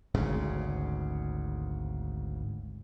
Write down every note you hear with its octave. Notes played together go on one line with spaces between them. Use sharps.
G#1 D2 G#2 C#3